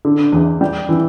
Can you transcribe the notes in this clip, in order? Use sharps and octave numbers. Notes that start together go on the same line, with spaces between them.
D3
E2
G3
E3